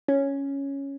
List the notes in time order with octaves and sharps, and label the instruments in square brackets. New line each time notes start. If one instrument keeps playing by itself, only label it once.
[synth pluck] C#4